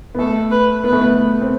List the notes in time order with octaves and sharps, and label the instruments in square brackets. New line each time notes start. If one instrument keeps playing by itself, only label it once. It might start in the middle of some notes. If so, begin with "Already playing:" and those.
[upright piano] B3
[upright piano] A3 [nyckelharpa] A4
[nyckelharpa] B4
[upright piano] B3 [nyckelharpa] B4
[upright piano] A3
B3
C4